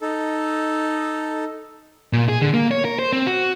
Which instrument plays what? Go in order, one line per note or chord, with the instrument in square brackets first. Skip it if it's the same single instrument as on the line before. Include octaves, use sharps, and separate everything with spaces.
[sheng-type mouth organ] D#4 A4
[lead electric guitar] A#2
G#4
D3
A#3
C#5
A#4
C5
C4
F#4